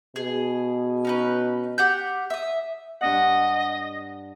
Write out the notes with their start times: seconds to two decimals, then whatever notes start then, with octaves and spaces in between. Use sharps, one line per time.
0.16 B2 G#4
1.05 C#4 D#4 B4
1.78 G4 F#5 G6
2.30 E5 D#6
3.01 G2 D4 D#5 F#5